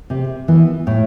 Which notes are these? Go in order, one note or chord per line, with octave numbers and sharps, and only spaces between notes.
C3
E3 B3
A2